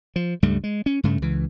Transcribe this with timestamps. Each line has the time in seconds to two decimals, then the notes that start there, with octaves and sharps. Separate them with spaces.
0.16 F3
0.43 C#2 G2 G3 A3
0.64 G#3
0.86 C#4
1.04 G2 C#3 A3
1.22 C#2 E3